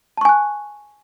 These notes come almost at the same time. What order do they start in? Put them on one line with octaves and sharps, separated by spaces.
A5 C#6 G#5 F#6